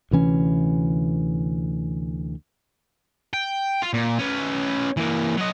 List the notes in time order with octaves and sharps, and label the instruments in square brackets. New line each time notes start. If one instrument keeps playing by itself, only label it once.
[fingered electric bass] D2 C3 E3 C#4
[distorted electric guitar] G5
F4
A#2
C#4 B4
E3 A#3
F#3 D#5